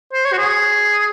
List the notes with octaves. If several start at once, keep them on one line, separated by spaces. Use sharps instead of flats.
C5
C#5
F#4
G#4